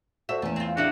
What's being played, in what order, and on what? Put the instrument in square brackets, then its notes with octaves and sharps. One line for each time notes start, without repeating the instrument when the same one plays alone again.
[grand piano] F#4 A4 C5 [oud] E5
[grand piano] E2 E3 [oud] A3 C#4
[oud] C4 F4
[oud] D2 C#3 G4 [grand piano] D4 E4 [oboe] F#4